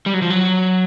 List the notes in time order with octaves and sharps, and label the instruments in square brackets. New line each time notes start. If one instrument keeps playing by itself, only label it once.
[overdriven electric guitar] G3
F#3
F3
F#3